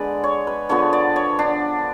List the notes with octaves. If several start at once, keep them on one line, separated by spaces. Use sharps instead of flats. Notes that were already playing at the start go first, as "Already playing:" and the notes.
Already playing: D3 G#3 B3 B4 D5
C#5
B4
D3 F3 B3 C#5
D5
C#5
D4